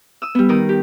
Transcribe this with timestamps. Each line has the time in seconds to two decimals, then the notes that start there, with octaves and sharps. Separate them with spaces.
0.22 D#6 E6
0.35 G3 B3
0.49 D#3 A#4 D#6
0.69 G4